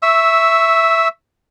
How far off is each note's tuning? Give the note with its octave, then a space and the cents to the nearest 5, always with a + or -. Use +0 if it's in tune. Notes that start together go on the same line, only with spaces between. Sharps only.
E5 +0 C#6 +0 E6 -15